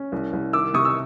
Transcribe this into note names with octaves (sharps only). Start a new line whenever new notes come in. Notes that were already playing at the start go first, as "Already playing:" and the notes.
Already playing: C#4
C2
C2
D#3 D6 E6
C3 C#6 D#6
E6